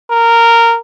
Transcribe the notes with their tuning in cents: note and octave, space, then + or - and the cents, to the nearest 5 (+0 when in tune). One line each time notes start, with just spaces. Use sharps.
A#4 -10